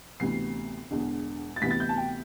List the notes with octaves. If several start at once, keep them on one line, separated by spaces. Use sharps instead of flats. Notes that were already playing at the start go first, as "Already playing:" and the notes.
D2 C3 E3 B3 C7
E1 E2 D3
A6
D2 C3 E3 B3 B6
A6
G6
A5
G5